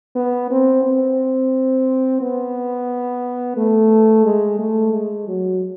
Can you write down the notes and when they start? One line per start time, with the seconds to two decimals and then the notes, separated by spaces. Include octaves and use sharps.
0.16 B3
0.51 C4
0.84 C4
2.21 B3
3.57 A3
4.25 G#3
4.59 A3
4.93 G#3
5.28 F#3